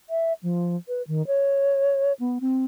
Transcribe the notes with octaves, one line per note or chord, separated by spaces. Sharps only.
E5
F3
B4
D#3
C#5
B3
C4